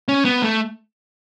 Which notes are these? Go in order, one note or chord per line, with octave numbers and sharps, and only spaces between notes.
C#4
B3
A3